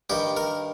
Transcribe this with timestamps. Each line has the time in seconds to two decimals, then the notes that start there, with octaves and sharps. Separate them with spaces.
0.10 G2 D#3 G4
0.37 A#4